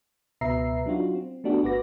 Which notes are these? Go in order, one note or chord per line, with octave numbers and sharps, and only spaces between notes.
C#2 B2 B4 E5 A#5 C7
F#3 D4 D#4 F4 F#4
C4
A3 B3 D4 F#4 G4
G1 F#4 B4 D6 A#6